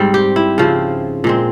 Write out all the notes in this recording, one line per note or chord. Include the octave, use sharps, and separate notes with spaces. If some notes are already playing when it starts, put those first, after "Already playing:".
Already playing: G#2 G3 C4
G4
E4
C#3 F3 C4 E4
A#2 G#3 C4